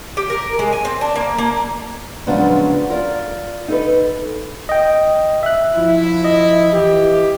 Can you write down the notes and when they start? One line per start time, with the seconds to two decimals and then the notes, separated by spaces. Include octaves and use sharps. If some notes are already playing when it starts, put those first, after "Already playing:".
0.17 G4
0.30 A#4
0.59 G#3
0.73 G#5
0.85 C4
1.01 D4
1.15 A#3
1.38 A#3
2.27 C#3 F3 F#3 G#3 B3 D4
2.89 F4 A#4 D5
3.68 D#4 A4 B4
4.69 D#5 G5
5.43 E5 F#6
5.76 F3 E4
6.25 D#5
6.73 E3 G4